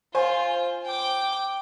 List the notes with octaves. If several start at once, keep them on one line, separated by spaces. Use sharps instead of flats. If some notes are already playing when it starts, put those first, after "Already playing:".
F4 C5 G#5
G5 D6